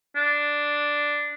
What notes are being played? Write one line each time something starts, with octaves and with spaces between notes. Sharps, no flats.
D4